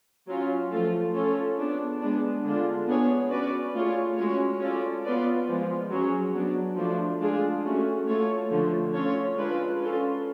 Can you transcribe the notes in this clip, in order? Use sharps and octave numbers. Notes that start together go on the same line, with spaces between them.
F#3 C#4 F4
F3 A3 F4 A4
C#4 F4 A4 C#5
B3 D4 G#4
G#3 B3 D4
D3 G#3 D4 F4
B3 D4 G#4 C#5
C#4 F#4 B4 D5
A3 F4 G#4 C#5
G#3 C#4 F#4 C#5
C#4 F4 A4 D5
B3 F4 B4 D5
F3 G#3 B3 F4
F#3 C#4 G#4 C#5
F#3 B3 D4
F3 A3 D4
G#3 D4 F4 G#4
A3 C#4 F#4
A3 F4 A4 C#5
D3 F3 A3
C#4 F4 A4 C#5
G#3 D4 F4 B4
C#4 F4 A4